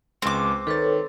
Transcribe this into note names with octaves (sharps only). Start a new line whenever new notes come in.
C#2 G#3 C4 D6
D#3 A4 B4 C#5 A6